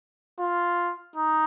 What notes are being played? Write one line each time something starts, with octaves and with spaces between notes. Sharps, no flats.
F4
D#4